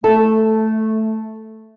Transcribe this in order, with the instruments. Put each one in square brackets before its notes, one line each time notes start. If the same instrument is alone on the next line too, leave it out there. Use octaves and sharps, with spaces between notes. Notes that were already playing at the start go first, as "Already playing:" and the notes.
[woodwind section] A3 [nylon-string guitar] A4